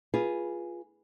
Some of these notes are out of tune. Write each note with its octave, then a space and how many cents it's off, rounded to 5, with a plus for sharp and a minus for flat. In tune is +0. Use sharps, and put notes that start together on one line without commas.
F4 +0 G#4 +0 B4 -15